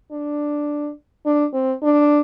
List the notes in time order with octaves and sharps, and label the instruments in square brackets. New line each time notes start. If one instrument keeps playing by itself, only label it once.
[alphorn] D4
D4
C4
D4